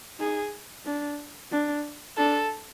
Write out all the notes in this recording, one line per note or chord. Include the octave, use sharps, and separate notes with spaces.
D#4 G#4
D4
D4
D4 A4